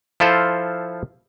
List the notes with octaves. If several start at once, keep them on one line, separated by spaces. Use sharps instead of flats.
F3 E4 F4 A4 C5